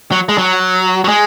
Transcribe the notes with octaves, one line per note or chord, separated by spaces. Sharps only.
F#3
G#3
F#3
F#3
G#3